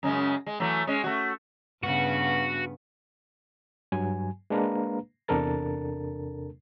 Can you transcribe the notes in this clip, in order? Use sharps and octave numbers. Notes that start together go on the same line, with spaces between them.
F#2 C#3 G#3
G#3
E3 F#3 A3
G#3 C#4
A3 F#4
G2 C#3 B3 F#4
G2 F#3 G#5
G#3 A#3 D4 B4 F5 A#5
E2 C3 D4 A4 A#4 A6